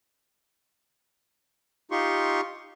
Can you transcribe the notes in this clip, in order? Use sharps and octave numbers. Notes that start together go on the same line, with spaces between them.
D#4 F4 G4 C6 C#6